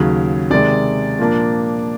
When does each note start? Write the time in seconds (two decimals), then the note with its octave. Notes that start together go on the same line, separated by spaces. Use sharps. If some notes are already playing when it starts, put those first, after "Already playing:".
Already playing: D#2 C#3 F#3
0.50 C3 D#3 G#3 D5
1.19 A#2 F3 A#3 D4